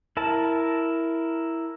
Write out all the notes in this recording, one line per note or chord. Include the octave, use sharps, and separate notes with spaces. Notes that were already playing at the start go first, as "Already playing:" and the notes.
E4 A#4 A5